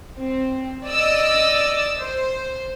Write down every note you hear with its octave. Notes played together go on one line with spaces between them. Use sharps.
C4
D5 D#5 E6
C5